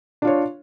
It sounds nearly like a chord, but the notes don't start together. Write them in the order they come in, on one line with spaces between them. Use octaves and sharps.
D4 F4 C#5